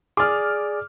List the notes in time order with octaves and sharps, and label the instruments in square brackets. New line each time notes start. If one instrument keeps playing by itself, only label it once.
[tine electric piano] G#4 D5 [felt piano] D6 F6